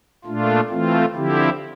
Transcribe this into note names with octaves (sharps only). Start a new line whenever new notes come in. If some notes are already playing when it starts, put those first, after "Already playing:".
A#2 A3 D4 F4
E3 A3 C4 F4
D3 F3 C4 E4 G4